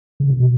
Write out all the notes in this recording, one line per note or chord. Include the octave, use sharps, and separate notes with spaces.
C#3
C3
B2